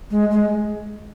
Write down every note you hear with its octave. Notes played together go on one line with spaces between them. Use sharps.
G#3
G#3